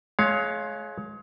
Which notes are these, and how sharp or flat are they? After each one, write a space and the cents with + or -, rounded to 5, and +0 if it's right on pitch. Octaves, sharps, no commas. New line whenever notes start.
G#3 +30 C#5 +0 F5 +0